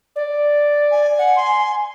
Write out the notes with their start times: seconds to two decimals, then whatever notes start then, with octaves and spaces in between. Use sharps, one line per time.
0.15 D5
0.91 G#5
1.19 F#5
1.36 C6